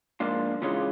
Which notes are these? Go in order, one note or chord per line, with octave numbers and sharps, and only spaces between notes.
G#2 F3 A#3 D4 F4
C#3 E3 G#3 C#4 F4